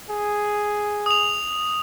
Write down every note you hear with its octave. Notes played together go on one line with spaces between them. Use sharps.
G#4
D#6 F7